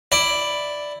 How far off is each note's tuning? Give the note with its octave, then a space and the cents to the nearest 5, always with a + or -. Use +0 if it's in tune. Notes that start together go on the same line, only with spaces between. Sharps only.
E4 +0 D5 +0